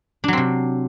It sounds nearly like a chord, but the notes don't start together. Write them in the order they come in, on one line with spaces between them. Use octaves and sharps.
D4 F#3 C4 C3